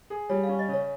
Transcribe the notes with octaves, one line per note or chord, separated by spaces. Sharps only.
G#4
G3 C#5
F5
C#4
D#5
C#3
C#5